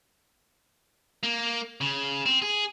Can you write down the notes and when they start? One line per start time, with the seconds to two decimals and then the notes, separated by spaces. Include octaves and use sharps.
1.23 A#3
1.81 C#3
2.26 C4
2.42 G#4